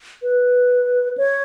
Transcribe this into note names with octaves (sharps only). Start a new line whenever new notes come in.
B4
C#5